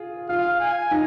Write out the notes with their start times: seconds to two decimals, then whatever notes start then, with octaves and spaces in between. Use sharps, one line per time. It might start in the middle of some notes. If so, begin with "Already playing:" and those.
Already playing: F4 G#4
0.28 F4 F5
0.60 G#5
0.91 D#4